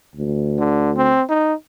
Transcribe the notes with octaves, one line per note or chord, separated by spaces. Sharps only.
D2
D3
C4
D#4